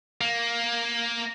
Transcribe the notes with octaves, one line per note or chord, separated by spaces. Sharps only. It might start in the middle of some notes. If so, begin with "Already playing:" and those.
A#3